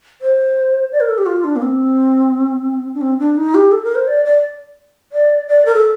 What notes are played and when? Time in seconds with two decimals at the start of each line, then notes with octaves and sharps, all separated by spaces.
0.21 C5
0.92 D5
1.00 A#4
1.09 A4
1.18 G4
1.26 F4
1.44 D4
1.56 A#3
1.62 C4
2.95 D4
3.01 C4
3.19 D4
3.37 D#4
3.55 G4
3.72 A4
3.84 A#4
3.95 C5
4.07 D5
4.25 D5
5.12 D5
5.48 D5
5.66 A#4
5.74 A4